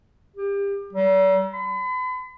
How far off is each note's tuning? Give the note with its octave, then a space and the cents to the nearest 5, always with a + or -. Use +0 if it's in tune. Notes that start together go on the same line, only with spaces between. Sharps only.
G4 +30
G3 -45
B5 +40